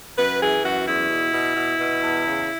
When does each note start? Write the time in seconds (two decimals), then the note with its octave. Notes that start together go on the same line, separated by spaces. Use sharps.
0.17 F#2 B4
0.40 E3 G#4
0.63 F#2 F#4
0.86 E2 E4
1.10 B2
1.33 B2
1.56 B2
1.79 B2
2.03 E2
2.25 C#3